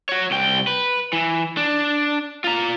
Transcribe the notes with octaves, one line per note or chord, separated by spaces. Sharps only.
F#4 C#5
C2 G5
B4
E3
D4
F4 A#5